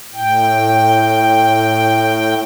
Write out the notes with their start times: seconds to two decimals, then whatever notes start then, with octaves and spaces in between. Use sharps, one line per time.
0.14 A2 G5